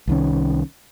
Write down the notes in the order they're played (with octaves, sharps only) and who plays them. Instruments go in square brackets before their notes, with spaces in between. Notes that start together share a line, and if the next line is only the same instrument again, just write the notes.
[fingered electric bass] C2 D#3 C#4